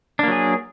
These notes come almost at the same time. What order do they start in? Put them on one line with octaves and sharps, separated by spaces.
D4 A#3 F#3 G#4